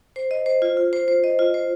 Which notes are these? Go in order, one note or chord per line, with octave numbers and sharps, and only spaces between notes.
C5
D#5
C5
F4
F4
C5
C5
D#5
F4
C5